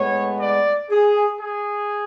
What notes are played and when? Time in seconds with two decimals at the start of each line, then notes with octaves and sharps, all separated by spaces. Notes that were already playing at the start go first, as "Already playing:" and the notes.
Already playing: A2 G#3 B3 C#5
0.40 D5
0.90 G#4
1.41 G#4